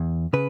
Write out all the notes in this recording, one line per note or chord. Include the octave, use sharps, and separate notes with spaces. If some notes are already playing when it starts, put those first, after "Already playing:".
Already playing: E2
C#3 B4